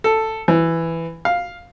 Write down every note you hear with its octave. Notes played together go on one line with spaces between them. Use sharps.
A4
E3
F5